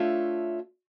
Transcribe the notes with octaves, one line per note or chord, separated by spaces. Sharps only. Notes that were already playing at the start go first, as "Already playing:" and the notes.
Already playing: A3 D4 F4 C#5 E5